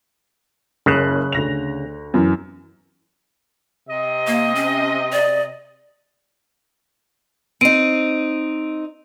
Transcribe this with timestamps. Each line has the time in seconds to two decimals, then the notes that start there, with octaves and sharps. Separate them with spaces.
0.86 F#1 C#3 F#6
1.32 D2 A#6 F7
2.14 F#2 E3
3.89 C3 D#5
4.27 A#3
4.55 C#4
5.12 D5
7.61 C4 D#4 D7 D#7